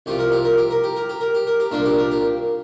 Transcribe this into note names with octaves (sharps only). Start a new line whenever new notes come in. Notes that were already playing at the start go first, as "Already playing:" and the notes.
C2 C3 F3 G4
A#4
G4
A#4
G4
A#4
G4
A#4
G4
A#4
G4
A#4
G4
C2 A#2 A#3 D4 A#4
G4
A#4
G4